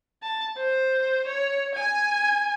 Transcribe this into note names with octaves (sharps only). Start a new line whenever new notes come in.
A5
C5
C#5
G#5